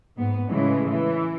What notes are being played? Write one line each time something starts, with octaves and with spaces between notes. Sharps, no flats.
G#2 B3
A2 C#3 E3 G#3
E3